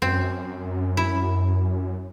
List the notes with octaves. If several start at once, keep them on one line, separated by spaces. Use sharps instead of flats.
F#2 C4
E4